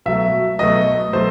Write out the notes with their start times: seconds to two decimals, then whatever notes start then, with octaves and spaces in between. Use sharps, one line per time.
0.06 B2 F#3 A3 E5
0.59 B2 F#3 A3 D#5
1.13 B2 F#3 A3 C5